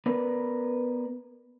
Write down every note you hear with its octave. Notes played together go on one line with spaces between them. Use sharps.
B3 A#4 B4 D5